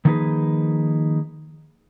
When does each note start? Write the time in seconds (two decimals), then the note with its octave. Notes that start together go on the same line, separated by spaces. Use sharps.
0.05 D#3 F3 A#3 D#4 G#4 B4